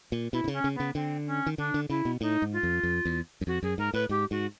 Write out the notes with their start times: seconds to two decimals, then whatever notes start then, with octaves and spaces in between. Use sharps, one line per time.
0.12 A#2
0.33 B2 E4
0.44 C3
0.48 C#3
0.53 C#4
0.64 C#3
0.75 C#3 B3
0.95 D3 C4
1.27 C#4
1.46 D#3
1.58 D3 D4
1.74 D3
1.89 C#3 E4
2.05 B2
2.21 A2 D#4
2.42 G#2
2.53 F4
2.63 F2
2.83 F2
3.05 E2
3.41 F#2
3.47 F2 F#4
3.63 F#2 G#4
3.78 G#2 A#4
3.93 A2 B4
4.09 G#2 G4
4.31 G#2 F#4